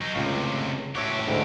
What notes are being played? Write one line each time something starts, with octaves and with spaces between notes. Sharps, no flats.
F#3 D#4
C#2 A2 C3 F5
A2 F#4 G4 C#5 E5
D2 G#2